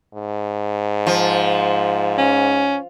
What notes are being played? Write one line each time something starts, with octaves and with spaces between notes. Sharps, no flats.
G#2
F3
C#4